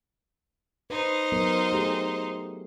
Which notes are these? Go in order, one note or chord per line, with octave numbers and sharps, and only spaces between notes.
D#4 B4 C5
F#3 B3 A#4
A3 G4 G#4